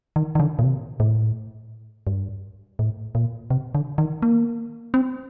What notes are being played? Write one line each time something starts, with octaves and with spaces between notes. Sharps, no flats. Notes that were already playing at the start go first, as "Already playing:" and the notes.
D#3
D#3
D3
A#2
C3
A2
G2
A2
A#2
C3
D3
D#3
A#3
C4